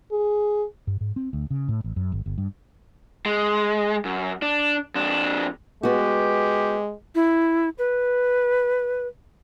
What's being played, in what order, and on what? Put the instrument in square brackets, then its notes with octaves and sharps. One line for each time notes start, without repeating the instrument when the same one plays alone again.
[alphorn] G#4
[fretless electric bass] G2
G#2
C4
D2
C#3
A2
A1
F#2
G#1
G1
G2
[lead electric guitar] G#3
F#2
D4
F2 D4
[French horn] G#3 [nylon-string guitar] B3 F#4 [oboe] G4
[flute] E4
B4